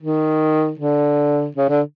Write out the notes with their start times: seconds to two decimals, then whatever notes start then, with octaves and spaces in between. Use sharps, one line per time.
0.02 D#3
0.79 D3
1.56 C#3
1.69 D3